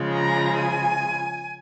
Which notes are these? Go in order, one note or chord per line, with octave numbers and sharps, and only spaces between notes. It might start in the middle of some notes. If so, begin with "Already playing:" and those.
Already playing: C#3 F3 G#3
A#5
G#5